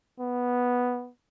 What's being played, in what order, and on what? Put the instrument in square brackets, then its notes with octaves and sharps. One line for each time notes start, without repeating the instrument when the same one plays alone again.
[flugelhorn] B3